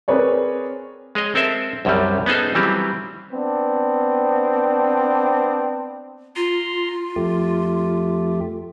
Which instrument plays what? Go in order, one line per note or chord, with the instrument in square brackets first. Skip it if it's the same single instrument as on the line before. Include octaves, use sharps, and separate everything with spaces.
[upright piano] C4 G#4 A#4 B4 C#5 D5
[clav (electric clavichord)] G#3 G#4 C#5 D#5
C4 A4 A#4 C5 E5
C2 F#2 C3 F#3 G3
B3 C#4 D#4 G#4 A4 C5
E3 F#3 G3 C4 G4
[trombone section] B3 C4 D4
[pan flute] F4 [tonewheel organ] A#5 C6
[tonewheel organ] F2 A3 G4